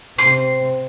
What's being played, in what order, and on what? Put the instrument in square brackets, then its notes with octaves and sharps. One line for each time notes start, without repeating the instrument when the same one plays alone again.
[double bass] C3 C4 [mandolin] C6